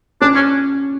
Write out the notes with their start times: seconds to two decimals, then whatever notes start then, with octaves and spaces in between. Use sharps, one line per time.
0.21 C#4 D4
0.35 C#4